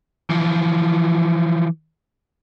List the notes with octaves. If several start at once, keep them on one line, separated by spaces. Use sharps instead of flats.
E3 F3